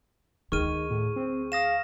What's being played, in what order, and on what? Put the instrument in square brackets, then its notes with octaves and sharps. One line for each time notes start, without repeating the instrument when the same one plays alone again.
[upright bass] D2 [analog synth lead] D#3 [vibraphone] G#4 [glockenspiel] C#6 F6 D#7
[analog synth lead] A2
C4
[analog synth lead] F5 [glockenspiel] D#6 A#6 E7